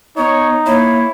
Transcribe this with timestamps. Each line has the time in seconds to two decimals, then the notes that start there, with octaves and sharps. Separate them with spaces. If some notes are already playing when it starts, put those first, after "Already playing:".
0.17 B3 D#4 C#5
0.66 A#3 E4 C#5